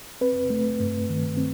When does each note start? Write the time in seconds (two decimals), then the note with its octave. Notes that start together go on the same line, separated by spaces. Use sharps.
0.21 C4 B4
0.50 A3
0.80 G2
1.09 D#3
1.37 C4